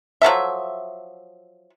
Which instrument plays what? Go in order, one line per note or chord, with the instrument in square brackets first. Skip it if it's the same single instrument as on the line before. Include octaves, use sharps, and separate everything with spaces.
[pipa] F3 F#3 A4 E5